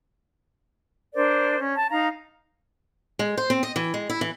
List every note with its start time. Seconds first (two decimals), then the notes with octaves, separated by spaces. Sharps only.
1.14 D4 A#4 C5 D5
1.58 C#4
1.75 A5
1.90 D#4 F5 A#5
3.19 G#3
3.37 C5
3.50 C4
3.63 D#5
3.76 E3
3.94 G#3
4.10 E4
4.21 E3